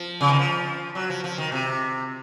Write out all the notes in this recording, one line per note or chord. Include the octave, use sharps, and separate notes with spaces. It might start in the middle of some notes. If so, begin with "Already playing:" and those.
Already playing: F3
C#3
D#3
F3
F#3
F3
F3
D#3
C3